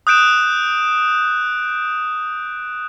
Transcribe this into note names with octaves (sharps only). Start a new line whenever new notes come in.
D#6 F#6 G6 D7 E7